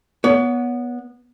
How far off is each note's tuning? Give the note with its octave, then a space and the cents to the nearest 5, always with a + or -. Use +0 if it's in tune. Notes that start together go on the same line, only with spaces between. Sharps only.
B3 -10 C#5 +30